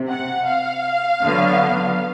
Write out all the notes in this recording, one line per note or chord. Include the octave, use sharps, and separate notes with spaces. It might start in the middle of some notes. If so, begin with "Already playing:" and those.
Already playing: C3
F#5
F5
D3 F#3 B3